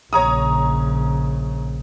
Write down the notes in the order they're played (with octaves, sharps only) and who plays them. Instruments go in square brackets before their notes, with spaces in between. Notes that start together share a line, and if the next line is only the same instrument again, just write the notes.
[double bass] A#1 C#3 [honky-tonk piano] C#5 A#5 D#6